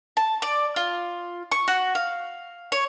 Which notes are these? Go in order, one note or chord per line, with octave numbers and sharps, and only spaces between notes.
A5
D5
F4
C#6
F#4
F5
C#5